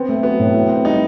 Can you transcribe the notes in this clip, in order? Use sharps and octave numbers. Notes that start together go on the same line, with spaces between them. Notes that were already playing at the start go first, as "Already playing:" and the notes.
Already playing: B3 C4
A3
F#3 B3
A2
A2
C4
G3 D#4